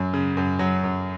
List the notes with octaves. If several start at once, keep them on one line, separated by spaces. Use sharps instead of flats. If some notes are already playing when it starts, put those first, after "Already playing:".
Already playing: F#2 F#3
C#3
F#2
F#3
F#2